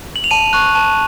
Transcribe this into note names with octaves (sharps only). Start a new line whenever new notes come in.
F#7
F7
A5 D#7
C#6 F#6
A5